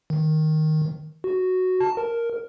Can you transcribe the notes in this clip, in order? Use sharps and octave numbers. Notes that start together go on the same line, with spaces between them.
D#3
F#4
A5
A#4